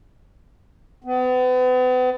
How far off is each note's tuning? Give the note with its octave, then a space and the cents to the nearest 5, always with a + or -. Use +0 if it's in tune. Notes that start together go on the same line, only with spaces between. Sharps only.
B3 +40